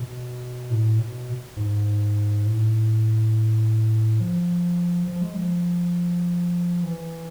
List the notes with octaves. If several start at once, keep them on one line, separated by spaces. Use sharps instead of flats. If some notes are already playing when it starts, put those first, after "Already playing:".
Already playing: B2
A2
B2
G#2
A2
F3
F3
G#3
F3
E3